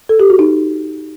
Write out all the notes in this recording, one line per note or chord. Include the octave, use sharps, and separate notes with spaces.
A4
G4
F#4
D#4